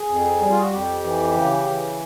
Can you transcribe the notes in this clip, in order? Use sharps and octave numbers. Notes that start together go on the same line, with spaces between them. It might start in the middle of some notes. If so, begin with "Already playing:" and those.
Already playing: G#4
F2
G3
F4
F#4
F2 G4
E3
C#3
E3